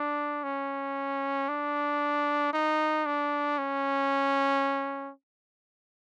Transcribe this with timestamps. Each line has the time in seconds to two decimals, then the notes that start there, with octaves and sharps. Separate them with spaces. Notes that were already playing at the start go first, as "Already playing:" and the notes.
Already playing: D4
0.43 C#4
1.48 D4
2.53 D#4
3.06 D4
3.58 C#4